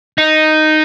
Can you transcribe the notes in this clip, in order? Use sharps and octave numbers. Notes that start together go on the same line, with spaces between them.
D#4